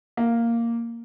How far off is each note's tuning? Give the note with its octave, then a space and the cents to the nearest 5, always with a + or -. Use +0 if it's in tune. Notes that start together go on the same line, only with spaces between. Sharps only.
A#3 -5